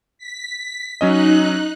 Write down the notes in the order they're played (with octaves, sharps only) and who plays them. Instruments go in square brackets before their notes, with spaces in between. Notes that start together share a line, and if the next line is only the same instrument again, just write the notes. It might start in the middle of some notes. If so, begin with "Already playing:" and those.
[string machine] B6
[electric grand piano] F#3 C#4 D#5 [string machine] D#4 F#6